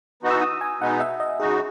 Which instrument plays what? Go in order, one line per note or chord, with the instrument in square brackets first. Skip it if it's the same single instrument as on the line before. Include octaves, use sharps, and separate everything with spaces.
[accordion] E3 B3 D#4 F#4
[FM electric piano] E6
D#6
G#5
[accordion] B2 G#3 B3 D#4 [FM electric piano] F#5
[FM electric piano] E5
D#5
[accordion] C#3 G#3 D#4 F#4 [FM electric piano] G#4